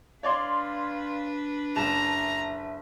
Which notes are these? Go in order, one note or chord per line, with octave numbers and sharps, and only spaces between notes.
D4 B4 C#5 D5 F5 C6
F#1 E5 A5 A#5 E7